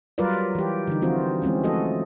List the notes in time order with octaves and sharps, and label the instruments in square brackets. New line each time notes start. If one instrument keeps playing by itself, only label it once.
[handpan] F#3 G3 F4 A#4 B4 D5
E3 G4
D3 E3 D#4
E3 F3 C4 F4 F#4 C5
E3 G#3 C4 C#4
F3 A3 F#4 A4 D#5